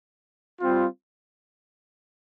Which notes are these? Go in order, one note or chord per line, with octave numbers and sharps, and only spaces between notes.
G3 C4 F4